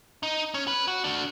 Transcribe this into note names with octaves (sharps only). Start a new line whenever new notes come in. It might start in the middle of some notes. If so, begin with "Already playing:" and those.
D#4
C#4
B4
F#4
D4 F#4